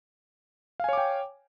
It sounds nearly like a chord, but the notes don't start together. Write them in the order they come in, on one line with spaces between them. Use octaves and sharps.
F5 G#5 C#5 D6 G5